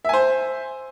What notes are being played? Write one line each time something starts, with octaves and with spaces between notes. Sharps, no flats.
C5 E5 G#5